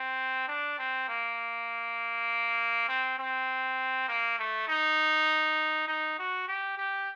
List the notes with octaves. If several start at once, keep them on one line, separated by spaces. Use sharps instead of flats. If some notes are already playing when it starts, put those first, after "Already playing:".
Already playing: C4
D4
C4
A#3
C4
C4
A#3
A3
D#4
D#4
F#4
G4
G4